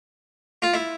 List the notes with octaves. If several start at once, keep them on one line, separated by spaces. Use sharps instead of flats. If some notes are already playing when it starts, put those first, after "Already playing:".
F4
E4